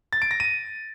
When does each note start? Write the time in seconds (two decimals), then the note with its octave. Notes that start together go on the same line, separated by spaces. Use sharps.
0.13 A6
0.22 D7
0.31 A#6
0.40 D#7